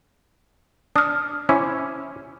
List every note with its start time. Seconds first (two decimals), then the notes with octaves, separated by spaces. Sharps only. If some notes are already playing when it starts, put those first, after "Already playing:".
0.96 D4 D#6 F6
1.49 C#4 E4 C5 D6